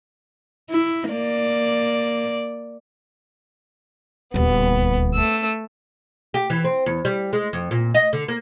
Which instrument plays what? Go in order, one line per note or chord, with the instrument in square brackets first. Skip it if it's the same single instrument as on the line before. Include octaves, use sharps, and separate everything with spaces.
[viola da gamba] E4
A#3 D5
[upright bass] D#1 D2 [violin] B3
[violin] A3 E6
[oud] G4
E3
C4
E2
G3
G#3
F2
A#2
D#5
D3
A#3